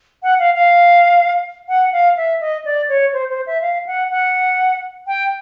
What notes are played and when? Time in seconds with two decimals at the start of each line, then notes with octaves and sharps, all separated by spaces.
0.23 F#5
0.39 F5
0.54 F5
1.68 F#5
1.92 F5
2.17 E5
2.41 D#5
2.65 D5
2.89 C#5
3.13 C5
3.30 C5
3.46 E5
3.61 F5
3.86 F#5
4.10 F#5
5.07 G5